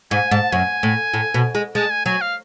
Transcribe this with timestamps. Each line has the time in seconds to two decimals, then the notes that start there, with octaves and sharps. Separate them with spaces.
0.11 G#2 G#5
0.31 G#2 A5
0.52 F#2 G#5
0.83 A2
1.14 A2
1.34 B2
1.55 G#3
1.75 G#3 A5
1.90 G#5
2.06 F#3 G#5
2.21 F5